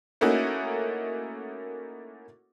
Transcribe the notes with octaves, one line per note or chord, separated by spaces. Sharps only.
A3 A#3 C#4 D#4 E4 F#4